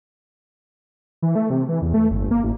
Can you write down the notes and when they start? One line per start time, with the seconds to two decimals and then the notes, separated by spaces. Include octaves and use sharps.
1.22 E3
1.35 A3
1.50 C3
1.68 E3
1.82 E2
1.94 A3
2.11 G1
2.31 A#3
2.44 A1